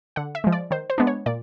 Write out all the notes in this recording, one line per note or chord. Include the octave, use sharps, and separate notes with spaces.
D3 F#5
E5
F3 G#3
D5
D#3 C5
C5
G#3 B3 D4
C#5
A#2 D5